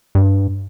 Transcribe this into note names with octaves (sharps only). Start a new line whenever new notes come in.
G2